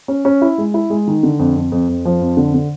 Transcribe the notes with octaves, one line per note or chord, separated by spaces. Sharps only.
C#4
C#4
E4
G#3
E4
G#3
D#3
D3
F2
F2
F2
F2
F3
F2
D3
D3